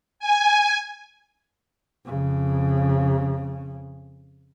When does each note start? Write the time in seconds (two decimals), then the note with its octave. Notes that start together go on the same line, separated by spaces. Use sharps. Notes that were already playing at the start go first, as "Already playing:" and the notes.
0.19 G#5
2.06 F2 C#3